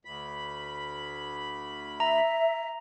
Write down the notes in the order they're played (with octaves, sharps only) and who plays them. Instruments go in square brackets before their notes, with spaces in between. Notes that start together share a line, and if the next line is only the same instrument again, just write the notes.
[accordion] D2 B5
[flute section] E5 [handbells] A#5